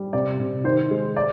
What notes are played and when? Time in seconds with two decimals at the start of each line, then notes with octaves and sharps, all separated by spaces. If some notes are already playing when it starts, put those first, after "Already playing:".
Already playing: G3
0.13 C3 D5
0.40 C3
0.64 D#3 C5
0.91 G#3
1.16 D5